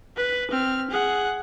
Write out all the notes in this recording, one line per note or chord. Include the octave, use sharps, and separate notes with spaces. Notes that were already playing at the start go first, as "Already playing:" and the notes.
B4
C4 F6
G#4 F#5